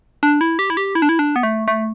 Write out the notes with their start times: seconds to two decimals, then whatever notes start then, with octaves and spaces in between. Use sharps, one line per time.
0.23 D4
0.41 E4
0.59 G4
0.70 E4
0.77 G4
0.95 E4
1.02 D4
1.09 E4
1.19 D4
1.36 B3
1.43 A3
1.68 A3